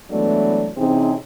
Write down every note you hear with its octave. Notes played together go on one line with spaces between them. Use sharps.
E3 F#3 G#3 A3 B3 D4
C3 E3 C4 C#4 D#4 G#4